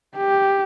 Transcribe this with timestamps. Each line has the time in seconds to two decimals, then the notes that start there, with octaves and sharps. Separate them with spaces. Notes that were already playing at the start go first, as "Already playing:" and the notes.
0.16 G4